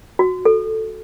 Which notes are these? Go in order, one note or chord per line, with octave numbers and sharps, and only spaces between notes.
F#4
A4